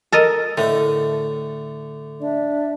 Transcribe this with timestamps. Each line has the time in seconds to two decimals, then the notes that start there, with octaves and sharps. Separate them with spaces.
0.12 A4 A#4 D#5
0.57 A2 D3 A3
2.21 D4 D5 E5